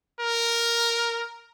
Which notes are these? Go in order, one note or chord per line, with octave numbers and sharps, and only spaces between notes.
A#4